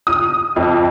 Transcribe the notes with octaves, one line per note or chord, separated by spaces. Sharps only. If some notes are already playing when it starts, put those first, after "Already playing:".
D#6
F2